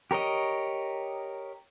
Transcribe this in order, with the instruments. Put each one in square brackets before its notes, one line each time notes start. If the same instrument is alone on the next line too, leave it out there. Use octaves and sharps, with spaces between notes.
[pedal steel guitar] G4 A#4 C#5 D#5